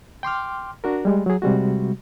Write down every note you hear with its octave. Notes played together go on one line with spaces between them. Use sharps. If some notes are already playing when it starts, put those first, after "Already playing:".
G5 C6 D6 F6
D4 F#4 A#4
G3 G#3
F#3 G#4
C3 G3 G#3 F#4